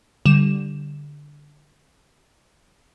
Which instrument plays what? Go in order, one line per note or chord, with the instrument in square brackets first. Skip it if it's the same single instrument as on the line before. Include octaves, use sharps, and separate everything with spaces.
[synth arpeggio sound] D3 G3 E7